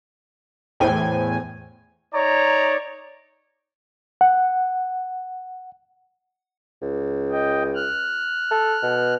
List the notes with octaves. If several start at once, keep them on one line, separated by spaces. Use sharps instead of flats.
E2 A2 C5 G5 G#5
D#4 C#5 D5 A#5
F#5
C#2
D#5 G5
F6 F#6
A4
B2